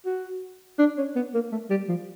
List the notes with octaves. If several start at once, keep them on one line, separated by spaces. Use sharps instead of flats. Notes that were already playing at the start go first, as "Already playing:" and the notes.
F#4
D4
C#4
B3
A#3
A3
G3
F3